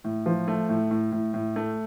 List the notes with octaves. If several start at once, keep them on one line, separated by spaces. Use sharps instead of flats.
A2
F3
A3
A2
A2
A2
A2
A3